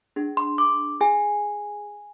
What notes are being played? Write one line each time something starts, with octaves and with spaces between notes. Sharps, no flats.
D4 G#4
C6
D6
G#4 G#5